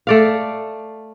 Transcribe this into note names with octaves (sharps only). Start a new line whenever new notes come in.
A3 D5 F5